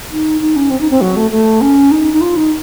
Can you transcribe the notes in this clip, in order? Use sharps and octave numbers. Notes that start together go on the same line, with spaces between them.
D#4
D#4
C#4
C4
D#4
C4
F#3
A3
A3
C#4
D#4
D#4
F4
D#4